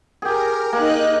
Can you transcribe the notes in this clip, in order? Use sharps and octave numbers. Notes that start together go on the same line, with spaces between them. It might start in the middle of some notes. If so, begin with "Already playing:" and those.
G4 G#4 A#4
A#3 D#4 D#5 F#6